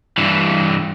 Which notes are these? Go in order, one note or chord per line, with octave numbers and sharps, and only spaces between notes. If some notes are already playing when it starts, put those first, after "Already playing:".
G2 E3